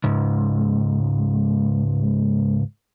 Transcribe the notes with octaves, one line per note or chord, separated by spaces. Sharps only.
C#2 G#2